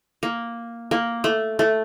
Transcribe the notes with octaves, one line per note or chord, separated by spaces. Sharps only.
A#3
A#3
A3
A3